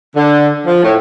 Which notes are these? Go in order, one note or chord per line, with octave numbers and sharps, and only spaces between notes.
D3
F3
A2